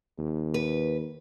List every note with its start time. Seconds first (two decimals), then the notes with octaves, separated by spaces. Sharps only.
0.18 D#2
0.54 B4